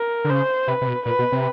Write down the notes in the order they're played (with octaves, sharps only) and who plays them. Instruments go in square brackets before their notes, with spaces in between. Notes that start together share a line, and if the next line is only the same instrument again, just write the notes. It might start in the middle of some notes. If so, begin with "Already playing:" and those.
Already playing: [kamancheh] A#4
[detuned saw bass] D3
[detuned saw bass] C#3 [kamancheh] C5
[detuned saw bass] C3 [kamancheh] B4
[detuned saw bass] C3
B2
[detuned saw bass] A#2 [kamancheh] B4
[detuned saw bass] B2
C3